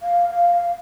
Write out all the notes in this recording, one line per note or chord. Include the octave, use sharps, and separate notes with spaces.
F5
F5